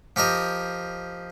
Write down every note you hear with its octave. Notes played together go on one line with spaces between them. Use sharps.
F3 G4 A#4 D#5